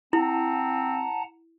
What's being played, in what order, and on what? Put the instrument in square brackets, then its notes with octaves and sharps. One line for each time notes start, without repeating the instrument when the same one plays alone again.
[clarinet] C4 [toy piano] E4 [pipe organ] F#5 A5 A#5